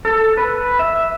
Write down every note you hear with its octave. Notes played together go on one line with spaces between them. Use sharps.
A4
B4
E5